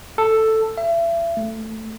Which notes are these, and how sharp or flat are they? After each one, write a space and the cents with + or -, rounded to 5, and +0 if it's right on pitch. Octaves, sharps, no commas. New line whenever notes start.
A4 +5
E5 +35
A3 +5